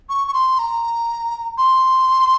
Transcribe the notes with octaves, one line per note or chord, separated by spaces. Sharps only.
C#6
C#6
C6
A#5
C6